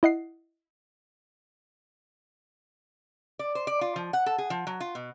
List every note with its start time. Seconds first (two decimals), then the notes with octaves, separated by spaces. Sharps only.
0.03 E4 D#5 F#5 C7
3.39 D5
3.55 C5
3.67 D5
3.81 F4
3.96 F3
4.13 F#5
4.26 A4
4.38 G#4
4.50 F3
4.67 F#3
4.80 F4
4.95 B2